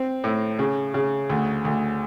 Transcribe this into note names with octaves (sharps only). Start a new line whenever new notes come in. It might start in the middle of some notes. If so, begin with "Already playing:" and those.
Already playing: C4
A2
C#3
C#3
D2
D2